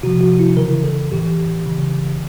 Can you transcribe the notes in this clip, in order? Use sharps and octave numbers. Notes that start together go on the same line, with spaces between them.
C3 F3 F#4
F#4
E4
C#3 E3 A#4
A4
A2 E3 G4
C#3 E3